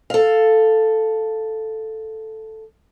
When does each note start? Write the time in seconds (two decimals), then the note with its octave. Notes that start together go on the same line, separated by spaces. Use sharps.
0.10 A4 F5